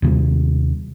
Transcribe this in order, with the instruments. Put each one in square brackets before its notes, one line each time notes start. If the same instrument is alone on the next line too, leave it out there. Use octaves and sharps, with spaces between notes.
[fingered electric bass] D#2 C3 G3